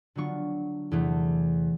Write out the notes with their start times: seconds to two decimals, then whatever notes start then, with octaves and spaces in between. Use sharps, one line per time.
0.15 D3 F#3 B3 D4 F4 C#6
0.91 E2 C3 E3 A3